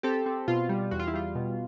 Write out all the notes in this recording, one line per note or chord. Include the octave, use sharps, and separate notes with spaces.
C4 G4 A4
C4
B2 F4
G3
E2 F#4
F4
E4
G3 F4
B2